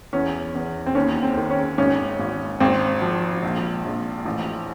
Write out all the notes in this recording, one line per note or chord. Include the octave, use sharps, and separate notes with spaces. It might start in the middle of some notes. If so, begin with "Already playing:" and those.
E2 C#4
E2
C4
D#2 C#4
C4
D#3
C#4
G#1 C#4
G#1
G#1 C4
F3
A#1
A#1
A1